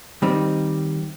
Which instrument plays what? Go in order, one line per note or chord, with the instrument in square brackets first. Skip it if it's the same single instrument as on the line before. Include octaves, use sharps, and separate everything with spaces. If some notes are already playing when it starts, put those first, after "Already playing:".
[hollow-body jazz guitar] D#3 G3 C4 D#4